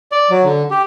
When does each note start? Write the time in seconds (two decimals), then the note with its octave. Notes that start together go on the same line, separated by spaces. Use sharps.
0.12 D5
0.30 F#3
0.44 D3
0.71 G4